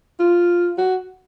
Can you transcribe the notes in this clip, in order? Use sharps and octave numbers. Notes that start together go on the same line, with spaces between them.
F4
F#4